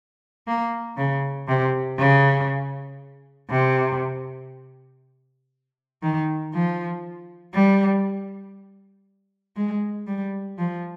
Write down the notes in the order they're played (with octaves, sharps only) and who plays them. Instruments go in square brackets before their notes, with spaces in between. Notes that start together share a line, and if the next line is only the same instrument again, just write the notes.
[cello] A#3
C#3
C3
C#3
C3
D#3
F3
G3
G#3
G3
F3